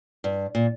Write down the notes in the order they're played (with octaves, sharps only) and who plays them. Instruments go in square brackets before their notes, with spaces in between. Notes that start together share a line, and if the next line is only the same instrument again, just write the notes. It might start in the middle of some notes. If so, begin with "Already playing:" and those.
[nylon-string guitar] G2
A#2